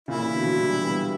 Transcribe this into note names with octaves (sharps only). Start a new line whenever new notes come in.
A#2 C#3 E4
C#3 E3
B2 D3
D3 F#3
E3 G3
G3 B3